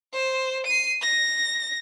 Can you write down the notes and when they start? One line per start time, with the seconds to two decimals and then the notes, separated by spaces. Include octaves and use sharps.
0.13 C5
0.66 C7 D#7
1.02 A#6